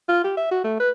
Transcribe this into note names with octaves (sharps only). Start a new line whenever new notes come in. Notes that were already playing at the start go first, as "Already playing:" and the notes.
F4
G4
E5
F#4
A3
B4